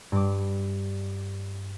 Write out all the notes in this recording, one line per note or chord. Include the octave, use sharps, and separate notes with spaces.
G2 D6